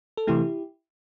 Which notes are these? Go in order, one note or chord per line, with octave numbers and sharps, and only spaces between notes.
A4
C3 E3 A3 E4 G4